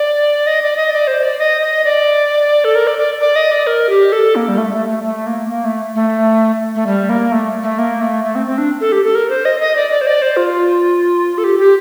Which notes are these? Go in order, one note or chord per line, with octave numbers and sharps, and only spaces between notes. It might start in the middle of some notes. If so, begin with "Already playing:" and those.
Already playing: D5
D#5
D5
D#5
D5
C5
D5
D#5
D#5
D5
A4
A#4
D5
D5
D5
D#5
D5
A#4
G4
A4
A#3
G3
A3
A3
A3
A3
A#3
A#3
A3
A3
A3
G3
A#3
A3
A3
A#3
A3
A3
C4
C4
D4
A4
G4
A4
A#4
C5
D#5
D#5
D5
D5
C5
D5
C5
F4
A4
G4
G4